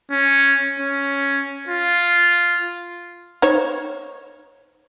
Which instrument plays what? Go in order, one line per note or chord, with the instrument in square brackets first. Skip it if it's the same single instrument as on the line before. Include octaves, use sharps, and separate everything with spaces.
[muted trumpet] C#4
C#4
F4
[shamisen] D#4 C5 C#5